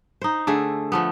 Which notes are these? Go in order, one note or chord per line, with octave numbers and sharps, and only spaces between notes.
D#4 C5
D3 A3 G#4
F3 A3 B3